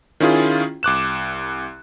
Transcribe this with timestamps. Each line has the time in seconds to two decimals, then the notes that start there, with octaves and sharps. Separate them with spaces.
0.20 D#3 C#4 E4 F4 G#4
0.83 C2 D6 F#6 E7